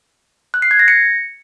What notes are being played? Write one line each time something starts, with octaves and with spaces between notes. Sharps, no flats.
F#6
C7
G#6
A#6
C#7